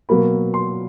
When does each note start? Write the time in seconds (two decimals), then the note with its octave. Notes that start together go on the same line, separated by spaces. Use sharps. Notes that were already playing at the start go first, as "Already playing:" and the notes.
0.09 B2 F#3 A#3 B5
0.54 C6